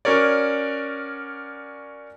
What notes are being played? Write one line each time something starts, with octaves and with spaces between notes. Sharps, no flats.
C#4 F#4 A#4 C#5 D5